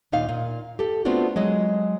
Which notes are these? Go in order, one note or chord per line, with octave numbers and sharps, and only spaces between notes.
D#2 A#2 D#4 F5
A#2
G4 A4
A3 B3 C4 D4 F4 F#4
F#3 G#3 D#5